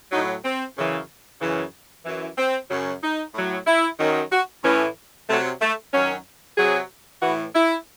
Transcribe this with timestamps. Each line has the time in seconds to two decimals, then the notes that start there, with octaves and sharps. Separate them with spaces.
0.11 A2 F#3 D#4
0.45 C4
0.77 F#2 C#3 E3
1.41 F#2 C#3 E3
2.05 F#2 E3
2.37 C4
2.70 F#2 C#3 F#3
3.03 D#4
3.34 A2 F#3
3.67 E4
3.99 F#2 D#3 F#3
4.32 F#4
4.64 A2 E3 C#4
5.28 C3 F#3 A3
5.61 A3
5.94 F#2 D#3 F#3 C#4
6.57 C3 F#3 G#4
7.22 A2 E3 F#4
7.55 E4